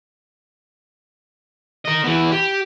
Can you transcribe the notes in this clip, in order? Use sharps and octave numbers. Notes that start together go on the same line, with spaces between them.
A#4 D#5
E3 B3
G4